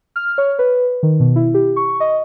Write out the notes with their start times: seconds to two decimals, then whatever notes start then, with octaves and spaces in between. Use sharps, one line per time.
0.16 F6
0.38 C#5
0.59 B4
1.03 D#3
1.20 B2
1.36 E4
1.54 G4
1.76 C#6
2.00 D#5